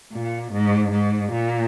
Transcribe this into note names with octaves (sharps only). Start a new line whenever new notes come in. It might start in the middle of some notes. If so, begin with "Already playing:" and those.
A#2
G#2
G#2
A#2